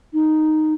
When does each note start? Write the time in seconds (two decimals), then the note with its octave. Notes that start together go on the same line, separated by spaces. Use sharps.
0.13 D#4